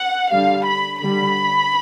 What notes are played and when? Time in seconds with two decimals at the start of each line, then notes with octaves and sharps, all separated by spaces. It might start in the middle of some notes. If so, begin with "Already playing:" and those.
Already playing: F#5
0.31 D3 G3 F5
0.66 B5
1.01 D3 G3 B5